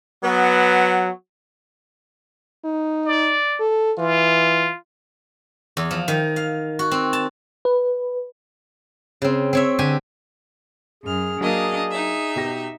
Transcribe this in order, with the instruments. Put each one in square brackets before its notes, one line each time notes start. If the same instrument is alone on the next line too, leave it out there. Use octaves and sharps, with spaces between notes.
[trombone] F#3 [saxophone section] B3
[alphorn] D#4
[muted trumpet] D5
[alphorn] A4
[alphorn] E3 [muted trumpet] F4
[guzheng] E2
F3
D#3
F5
F#4
C4
A5
[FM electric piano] B4
[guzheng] C#3 C4
C4 C#5 E5
D3 G4 G#5
[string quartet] F#2 F6 [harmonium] G#4
[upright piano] F#3 A#3 [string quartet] D4 D#5 F5
[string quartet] D#4 E5
[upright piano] B2 G4 A#6